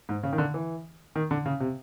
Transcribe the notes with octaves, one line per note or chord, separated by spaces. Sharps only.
G#2
C#3
D#3
D3
E3
D#3
D3
C#3
C3